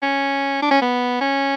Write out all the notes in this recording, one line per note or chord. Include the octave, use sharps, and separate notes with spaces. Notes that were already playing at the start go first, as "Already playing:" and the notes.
C#4
D4
C#4
B3
C#4